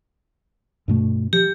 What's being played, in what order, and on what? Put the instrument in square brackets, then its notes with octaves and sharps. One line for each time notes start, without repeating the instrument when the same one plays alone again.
[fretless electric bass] G2 B2 A3
[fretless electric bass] F3 [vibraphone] G4